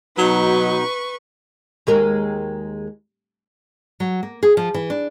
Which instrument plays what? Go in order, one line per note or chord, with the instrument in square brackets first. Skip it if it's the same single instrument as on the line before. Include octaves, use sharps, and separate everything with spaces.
[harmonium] B2 D#4 [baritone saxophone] F#3 [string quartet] B4 C#6
[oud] D#2 G#3 A#4
[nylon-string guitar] F#3
A#3
G#4
F3
E3
D4